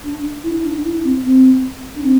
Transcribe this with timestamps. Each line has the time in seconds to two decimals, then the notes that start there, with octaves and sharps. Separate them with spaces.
0.04 D4
0.43 E4
0.64 D4
0.84 E4
1.04 C4
1.25 C4
1.95 D4
2.03 C4